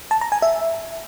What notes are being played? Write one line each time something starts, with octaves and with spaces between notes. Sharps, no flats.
A5
A#5
G#5
E5